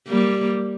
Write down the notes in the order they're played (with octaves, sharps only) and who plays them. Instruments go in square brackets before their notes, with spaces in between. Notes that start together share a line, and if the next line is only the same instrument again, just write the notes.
[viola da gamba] G3 A#3